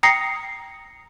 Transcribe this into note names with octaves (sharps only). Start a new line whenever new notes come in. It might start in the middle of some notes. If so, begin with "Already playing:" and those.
G5 A#5 D#6 A#6 C7 C#7